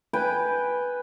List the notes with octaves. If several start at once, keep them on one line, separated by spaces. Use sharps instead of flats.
B4 G5 G#5